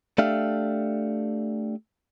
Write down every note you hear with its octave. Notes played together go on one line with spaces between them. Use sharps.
A3 D4 G4 E5 F5